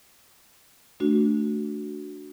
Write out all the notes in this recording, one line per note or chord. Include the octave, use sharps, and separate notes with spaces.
A3 D4 F#4